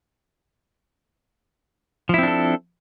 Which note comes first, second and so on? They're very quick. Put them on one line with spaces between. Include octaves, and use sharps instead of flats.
F3 E4 C4 D4 A4